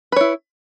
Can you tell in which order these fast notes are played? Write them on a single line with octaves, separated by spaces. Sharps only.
B4 C#5 E4